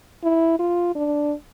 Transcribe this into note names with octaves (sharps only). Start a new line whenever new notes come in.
E4
F4
D4